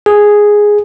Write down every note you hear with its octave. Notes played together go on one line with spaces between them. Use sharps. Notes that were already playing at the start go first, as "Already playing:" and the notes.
G#4